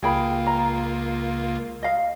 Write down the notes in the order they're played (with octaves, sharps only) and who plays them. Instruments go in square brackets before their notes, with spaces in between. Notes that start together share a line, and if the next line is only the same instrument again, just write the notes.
[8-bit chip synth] C#2 A#3 F4 [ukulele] G#4 G5 B5
[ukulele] A#5
D#5 F5